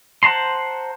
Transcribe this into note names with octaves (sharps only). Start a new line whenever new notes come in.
C5 F#5 A5 A#5 C6